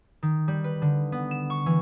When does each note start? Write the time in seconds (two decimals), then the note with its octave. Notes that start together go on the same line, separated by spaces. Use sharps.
0.23 D#3
0.48 G3
0.64 B4
0.82 D3
1.12 B3
1.31 E7
1.50 C#6
1.66 E3